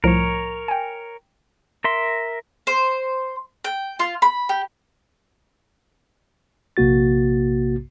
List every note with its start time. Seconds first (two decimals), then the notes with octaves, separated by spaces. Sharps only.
0.04 C2 A2 F3 A#4 C#5
0.68 G5 G#5
1.84 A#4 E5 C6
2.67 C5
3.64 G5
3.99 F4
4.22 B5
4.49 G4
6.77 A#1 C3 A#3 F#4 A6